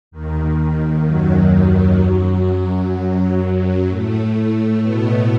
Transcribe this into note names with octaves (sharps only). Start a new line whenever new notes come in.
D#2 D#3
F#2 F#3
A2 A3
B2 B3